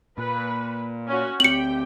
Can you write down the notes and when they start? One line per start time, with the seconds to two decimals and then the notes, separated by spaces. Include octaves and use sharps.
0.18 A#2 B4
1.08 C#4 F#4
1.40 D2 C4 G4 G5 C#7 F#7